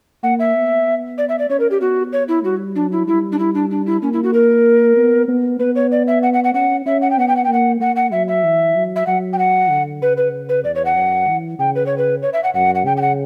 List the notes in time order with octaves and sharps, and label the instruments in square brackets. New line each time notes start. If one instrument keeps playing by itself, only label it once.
[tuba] A#3 [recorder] F#5
[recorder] E5
[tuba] B3
[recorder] D5
E5
D5
[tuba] C#4 [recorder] C#5
[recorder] A#4
G4
[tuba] B3 [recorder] F#4
[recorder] C#5
E4
[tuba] G3 [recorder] F#4
[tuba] F#3 [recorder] D4
[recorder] E4
[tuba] G3 [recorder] E4
[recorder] D4
E4
D4
D4
E4
[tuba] A#3 [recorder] C#4
[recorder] E4
F#4
A#4
[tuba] B3
B3
[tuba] B3 [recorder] B4
[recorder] C#5
D5
E5
F#5
F#5
F#5
[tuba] C#4 [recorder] F#5
[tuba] C#4 [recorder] E5
[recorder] F#5
G5
[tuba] B3 [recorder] F#5
[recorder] G5
F#5
G5
[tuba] A#3 [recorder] F#5
[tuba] A#3 [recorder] F#5
[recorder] F#5
[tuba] F#3 [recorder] E5
[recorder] E5
[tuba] E3
F#3
[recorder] E5
[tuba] F#3 [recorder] F#5
[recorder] G5
F#5
[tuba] D3
[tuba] C#3 [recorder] B4
[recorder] B4
B4
[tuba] E2 [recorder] D5
[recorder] C#5
F#5
[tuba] F#2
E3
[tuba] C#3 [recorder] G5
[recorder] B4
C#5
B4
C#5
E5
F#5
[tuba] F#2 [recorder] F#5
[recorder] F#5
[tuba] C#3 [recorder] G5
[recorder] G5
F#5